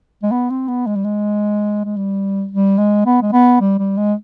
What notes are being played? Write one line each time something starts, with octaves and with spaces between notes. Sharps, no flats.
G#3
B3
C4
B3
G#3
G3
G#3
G#3
G3
G3
G#3
B3
G#3
B3
G3
G3
G#3